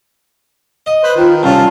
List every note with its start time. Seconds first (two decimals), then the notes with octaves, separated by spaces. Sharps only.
0.86 D#5
1.03 B4 C5
1.16 D#3 F4
1.43 C2 C#4 F4 A5